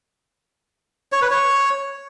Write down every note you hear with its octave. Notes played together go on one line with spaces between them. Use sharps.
C#5
B4
C#5